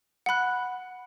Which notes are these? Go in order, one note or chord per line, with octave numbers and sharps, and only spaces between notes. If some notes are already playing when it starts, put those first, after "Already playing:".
F#5 B5 F#6